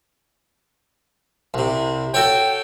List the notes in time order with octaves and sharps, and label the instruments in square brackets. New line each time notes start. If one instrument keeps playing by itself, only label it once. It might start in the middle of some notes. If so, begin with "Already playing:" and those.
[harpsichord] C2 C3
[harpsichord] F#4 A4 C#5 [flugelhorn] G5